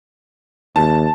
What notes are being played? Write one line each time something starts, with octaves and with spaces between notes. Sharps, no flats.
D#2 A5